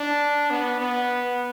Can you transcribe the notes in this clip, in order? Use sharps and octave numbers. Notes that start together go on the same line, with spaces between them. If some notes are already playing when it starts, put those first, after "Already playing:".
Already playing: D4
B3
B3